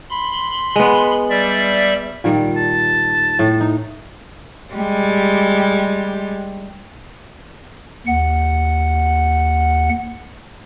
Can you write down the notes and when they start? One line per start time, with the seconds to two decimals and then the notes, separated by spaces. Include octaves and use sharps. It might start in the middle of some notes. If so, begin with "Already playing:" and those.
0.10 B5 C6
0.76 G#3 B3
1.30 G3 D5 E5
2.24 A#2 D#3 G3
2.57 A5
3.39 A2
3.61 D#4
4.75 G3 G#3 G4
8.07 D#2 F#5